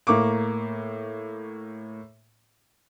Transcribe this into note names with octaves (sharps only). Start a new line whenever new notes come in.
A2 A#3 C#6 D6